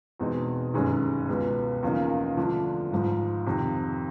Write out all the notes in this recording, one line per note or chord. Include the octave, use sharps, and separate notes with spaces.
E2 B2 G#3 C4 D#4
G1 F#2 D#3 G#3 C#4
C#2 B2 G#3 B3
E2 C#3 F3 A#3 D#4
D3 F3 A3 D4
G#1 G#2 F3
F2 C3 D#3